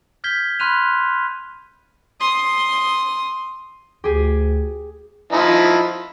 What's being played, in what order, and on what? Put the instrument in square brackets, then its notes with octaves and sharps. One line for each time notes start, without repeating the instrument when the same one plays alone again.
[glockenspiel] F6 G6 G#6 B6 G7
B5 C6 F6 F#6 D#7 F7
[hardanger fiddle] C6 D#6
[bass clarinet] D2 [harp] G4 G#4
[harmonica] F3 D#4 E4